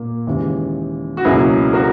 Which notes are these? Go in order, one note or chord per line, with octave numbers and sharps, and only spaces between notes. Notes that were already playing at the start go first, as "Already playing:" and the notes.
Already playing: A#2 A#3
D#2 C#3 E3 G#3
F#4
C#2 B2 F#3 A#3 E4 G#4
F#4 A#4